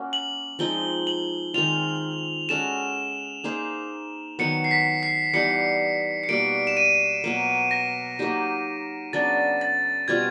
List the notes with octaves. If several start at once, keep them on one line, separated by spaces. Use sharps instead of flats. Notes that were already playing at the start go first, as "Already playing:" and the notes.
Already playing: A#3 C#4 F#4
F#7
F3 G#3 C4 D#4 G7
F#7
D#3 G#3 C4 F4 F7
G#3 C#4 F#4 A4 E7
A#3 D#4 G#4 C5
D#3 F#3 B3 C#7
C7
B6
C7
E3 G3 B3 D#4 C#7
C#7
B2 G3 A#3 D7
E7
D#7
B2 F#3 A#3
A#6
F#3 A#3 D#4 G4
C#3 F#3 B3 D4 A6
A6
B2 G3 C4 F4 G#6